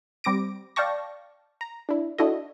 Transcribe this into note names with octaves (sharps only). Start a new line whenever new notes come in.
G3 C4 D6 A#6 D7
D5 F5 G5 A5 C#6 A#6
A#5
D4 E4
D4 E4 F#4 A4 D#5